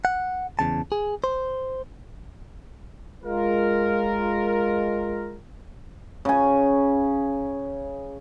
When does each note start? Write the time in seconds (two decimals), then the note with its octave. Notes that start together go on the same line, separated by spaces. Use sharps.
0.05 F#5
0.59 E2 C#3 A5
0.92 G#4
1.24 C5
3.24 G#3 F4 A#4
6.25 C#3 G#5